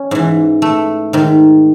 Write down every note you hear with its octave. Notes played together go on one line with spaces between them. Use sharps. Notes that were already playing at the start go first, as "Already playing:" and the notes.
Already playing: C#4
G#2 E3
A3
G#2 D#3